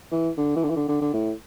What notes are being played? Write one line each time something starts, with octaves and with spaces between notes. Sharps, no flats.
E3
D3
E3
D3
E3
D3
D3
D3
A2